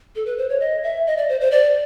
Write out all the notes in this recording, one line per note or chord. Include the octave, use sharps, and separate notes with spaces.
A4
B4
C5
C#5
D#5
E5
D#5
D5
C5
C5
D5